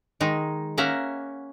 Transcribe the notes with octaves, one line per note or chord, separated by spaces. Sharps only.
D#3 G#3 D#4
A#3 C#4 E5 F#5 A#5